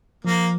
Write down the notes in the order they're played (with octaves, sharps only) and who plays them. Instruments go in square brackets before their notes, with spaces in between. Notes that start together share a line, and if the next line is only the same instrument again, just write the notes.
[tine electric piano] F3 [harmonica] A#3